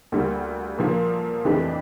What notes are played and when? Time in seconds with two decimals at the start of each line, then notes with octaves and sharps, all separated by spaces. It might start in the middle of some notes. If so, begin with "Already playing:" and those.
0.12 D2 D3 G3 A#3
0.78 A#2 F3 A#3
1.45 F2 E3 A3 D4 G4